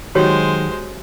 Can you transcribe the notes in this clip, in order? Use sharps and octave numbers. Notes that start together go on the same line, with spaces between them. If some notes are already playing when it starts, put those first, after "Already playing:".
D#3 F#3 G#3 F#4 G4 C5 C#5